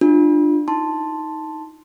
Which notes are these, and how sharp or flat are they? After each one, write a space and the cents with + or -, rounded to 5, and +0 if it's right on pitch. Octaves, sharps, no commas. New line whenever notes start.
D4 +30 F4 +0
D#4 +20 A5 +0 C6 +0